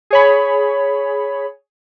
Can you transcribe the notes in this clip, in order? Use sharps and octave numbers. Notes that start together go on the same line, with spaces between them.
G#4 C#5 B5